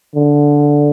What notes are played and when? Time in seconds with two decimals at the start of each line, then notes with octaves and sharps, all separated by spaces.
0.15 D3